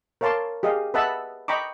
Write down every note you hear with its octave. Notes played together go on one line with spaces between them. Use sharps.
A#4 C#5 F5 A5 C6 D6
G4 G#4 D#5 F5
B4 D#5 E5 F#5 A5 B5
D#5 G5 A#5 B5 C#6 D6